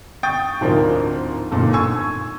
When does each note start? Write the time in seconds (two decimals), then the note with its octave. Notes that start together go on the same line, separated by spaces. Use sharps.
0.23 G5 C#6 D#6 G6 A6
0.61 D1 G#2 F3 D4 A#4
1.51 D1 G1 A#2 D#3 A4
1.73 G#5 C#6 E6 G#6